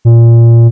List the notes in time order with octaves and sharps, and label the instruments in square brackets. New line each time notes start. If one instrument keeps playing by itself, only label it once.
[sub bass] A#2